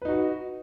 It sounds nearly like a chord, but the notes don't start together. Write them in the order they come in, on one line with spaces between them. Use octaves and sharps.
B4 D#4 F#4